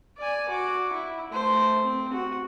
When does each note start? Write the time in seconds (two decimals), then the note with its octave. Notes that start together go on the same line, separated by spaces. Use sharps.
0.18 D5 G#5
0.49 F#4 D6
0.93 E4
1.31 A3 C5
1.82 C4
2.13 F#4